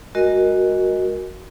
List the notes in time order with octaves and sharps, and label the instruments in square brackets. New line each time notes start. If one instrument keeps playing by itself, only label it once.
[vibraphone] G#3 F#4 A#4 D#5